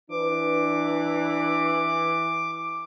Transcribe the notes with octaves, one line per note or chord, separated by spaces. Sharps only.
E3 D4 B4 D6